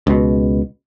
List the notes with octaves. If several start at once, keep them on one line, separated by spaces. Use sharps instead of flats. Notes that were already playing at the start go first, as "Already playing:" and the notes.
C#2 B2